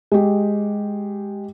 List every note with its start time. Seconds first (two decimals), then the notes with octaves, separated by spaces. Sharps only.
0.12 G#3 G4